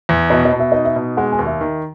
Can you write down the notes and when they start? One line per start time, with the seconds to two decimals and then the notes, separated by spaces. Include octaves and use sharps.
0.09 E2
0.30 B2 D#5
0.45 D#5
0.53 B2
0.60 E5
0.72 D#4 D#5
0.85 E5
0.96 B2
1.17 G#3 F#5
1.32 G#5
1.39 D#2
1.47 E5
1.61 D#3